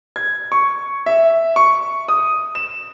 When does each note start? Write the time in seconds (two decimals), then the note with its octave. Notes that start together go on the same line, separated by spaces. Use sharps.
0.16 G#6
0.52 C#6
1.06 E5
1.56 C#6
2.08 D#6
2.55 E7